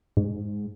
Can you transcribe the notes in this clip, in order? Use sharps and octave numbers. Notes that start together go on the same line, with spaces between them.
G#2